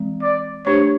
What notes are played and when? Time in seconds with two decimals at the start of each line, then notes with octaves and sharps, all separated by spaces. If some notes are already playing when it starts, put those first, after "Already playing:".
Already playing: E3 G#3 C4
0.22 D5
0.66 A3 D4 G4 C5 C#5